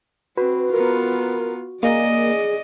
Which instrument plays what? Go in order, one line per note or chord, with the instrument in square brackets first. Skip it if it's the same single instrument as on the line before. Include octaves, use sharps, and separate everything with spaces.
[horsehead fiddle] C4 [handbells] F#4 [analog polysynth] B4
[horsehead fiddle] B3 F4 [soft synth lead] A#4
[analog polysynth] A#3 [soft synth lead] G#4 [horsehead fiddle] D5 D#5